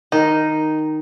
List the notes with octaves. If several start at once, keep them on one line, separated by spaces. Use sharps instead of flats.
D#3 D#4